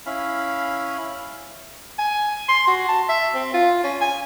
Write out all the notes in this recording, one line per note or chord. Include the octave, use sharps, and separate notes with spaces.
C#4 E4 F5 B5
G#5
C6
F#4
A5
E5
C4
F4
C#4
G#5